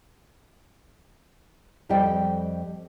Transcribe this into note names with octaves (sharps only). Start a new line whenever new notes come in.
F2 G3 C5 D#5 G5